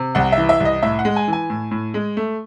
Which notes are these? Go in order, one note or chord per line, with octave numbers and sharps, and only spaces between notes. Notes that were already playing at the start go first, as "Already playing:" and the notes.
Already playing: C3
C2 F#5
E5
E3
E5
C2
D#5
A2 E5
F#5
G#3
G#5
E3
G#5
A2
A2
G#3
A3